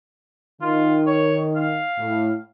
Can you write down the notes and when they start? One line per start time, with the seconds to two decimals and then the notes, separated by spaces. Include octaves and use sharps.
0.61 D#3 F4
1.07 C#5
1.56 F5
1.98 A2